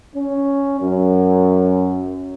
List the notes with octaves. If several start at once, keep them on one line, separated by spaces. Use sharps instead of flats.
C#4
F#2